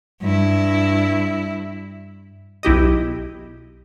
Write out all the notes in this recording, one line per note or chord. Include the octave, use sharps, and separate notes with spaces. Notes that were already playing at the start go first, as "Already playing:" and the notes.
G2 E4
B1 E4 G4 D#5